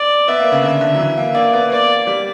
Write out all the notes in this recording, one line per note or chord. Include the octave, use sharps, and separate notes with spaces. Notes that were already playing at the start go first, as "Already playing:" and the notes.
Already playing: D5
B3 E5
A#3
C#3
D3 E5
D3
F#3
E3
A#3
A#3 D5
B3
A#3 D5
G3